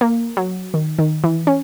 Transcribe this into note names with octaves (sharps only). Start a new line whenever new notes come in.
A#3
F#3
D#3
D#3
E3
C#4